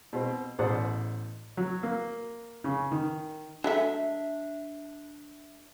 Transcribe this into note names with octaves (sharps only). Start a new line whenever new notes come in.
B2 C4
A1 B2 C5 D5 F#5 D#6
F#3
A#3
C#3
D#3
F#3 G#3 A3 D4 E5